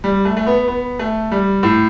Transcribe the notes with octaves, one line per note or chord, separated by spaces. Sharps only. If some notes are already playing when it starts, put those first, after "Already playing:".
G3
A3
A3
B3
B3
A3
G3
A2